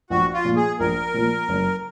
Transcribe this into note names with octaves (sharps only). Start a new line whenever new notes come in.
A#1 F#4
F4
A#2 F3
G#4
A#1 A#4
A#2 F3
F#1